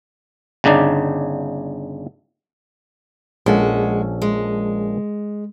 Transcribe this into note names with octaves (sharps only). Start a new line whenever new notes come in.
G1 C#3 D4 D#4 D5
A#1 G#3 C#4 F#4 A4
G#3